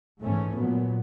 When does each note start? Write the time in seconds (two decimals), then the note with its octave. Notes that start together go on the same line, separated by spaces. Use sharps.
0.19 G#2 E3 A3 C#4
0.55 A#2 F#3 B3